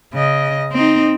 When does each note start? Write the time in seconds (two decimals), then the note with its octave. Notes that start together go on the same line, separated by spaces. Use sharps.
0.14 C#3 D#5
0.73 C4 D#4